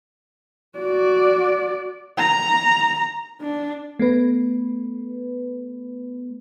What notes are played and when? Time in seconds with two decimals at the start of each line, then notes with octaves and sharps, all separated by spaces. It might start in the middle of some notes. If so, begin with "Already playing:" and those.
0.78 F#4 D5
2.18 A#5
3.41 D4
3.99 A3 B3 B4